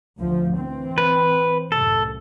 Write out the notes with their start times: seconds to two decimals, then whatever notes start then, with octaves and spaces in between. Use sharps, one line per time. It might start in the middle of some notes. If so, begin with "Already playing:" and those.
0.19 D2 F3
0.58 E3 C4
0.98 B4
1.72 C2 F#2 A2 A4